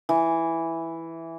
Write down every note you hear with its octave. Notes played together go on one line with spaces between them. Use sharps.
E3